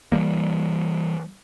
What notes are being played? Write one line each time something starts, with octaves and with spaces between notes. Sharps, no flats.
E3 F#3 G3 A#3